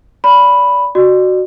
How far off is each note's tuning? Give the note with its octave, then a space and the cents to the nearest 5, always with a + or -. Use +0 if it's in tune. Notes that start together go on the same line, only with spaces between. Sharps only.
D5 -25 B5 +0
F#4 +0 D5 +40